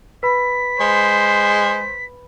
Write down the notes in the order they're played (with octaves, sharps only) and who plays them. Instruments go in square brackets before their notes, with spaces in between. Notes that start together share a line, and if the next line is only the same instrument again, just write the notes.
[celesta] B4 B5 [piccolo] B6
[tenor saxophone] G#3 [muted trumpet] C5